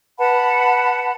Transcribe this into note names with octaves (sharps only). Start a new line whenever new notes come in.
B4 F#5 A5 B5